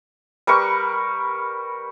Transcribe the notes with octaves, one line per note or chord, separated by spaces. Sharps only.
G3 A#4 B4 C#6